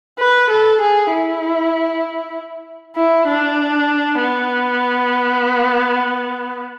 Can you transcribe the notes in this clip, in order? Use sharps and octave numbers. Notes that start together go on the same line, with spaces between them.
B4
A4
G#4
E4
E4
D4
B3